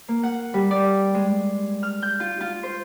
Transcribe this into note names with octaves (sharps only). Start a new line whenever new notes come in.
A#3
F#5
G3
D5
G#3
F6
G6
F4
F4
C5